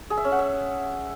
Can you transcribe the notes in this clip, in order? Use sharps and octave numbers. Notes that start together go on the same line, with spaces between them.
G#4
E5
C#4
F#5
E5